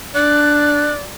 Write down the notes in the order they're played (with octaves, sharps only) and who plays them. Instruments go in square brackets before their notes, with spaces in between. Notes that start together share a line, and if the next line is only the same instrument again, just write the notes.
[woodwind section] D4 [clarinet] D5 [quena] F#6